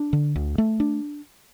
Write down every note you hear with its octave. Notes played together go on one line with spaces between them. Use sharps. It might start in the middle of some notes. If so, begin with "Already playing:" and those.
Already playing: D4
D3
D2
A3
D4